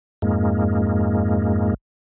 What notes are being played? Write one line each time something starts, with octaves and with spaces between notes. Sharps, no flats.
F2 G#2 G#3 A#3